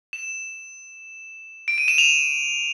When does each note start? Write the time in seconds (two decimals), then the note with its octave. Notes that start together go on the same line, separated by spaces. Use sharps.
0.13 E7
1.68 D7
1.78 D#7
1.88 E7
1.98 F7